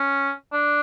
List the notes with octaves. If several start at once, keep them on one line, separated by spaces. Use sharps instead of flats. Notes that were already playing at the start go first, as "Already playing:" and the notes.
Already playing: C#4
D4